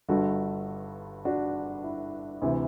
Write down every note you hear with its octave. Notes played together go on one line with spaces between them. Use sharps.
G1 G2 D3 F#4 A4
D4 F#4
E4
D2 C3 E3